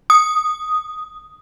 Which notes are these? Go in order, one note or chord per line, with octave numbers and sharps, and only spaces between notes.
D#6